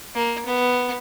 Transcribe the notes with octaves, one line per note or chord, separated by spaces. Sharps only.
A#3
B3